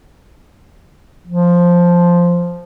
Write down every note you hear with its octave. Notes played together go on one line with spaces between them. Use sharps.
F3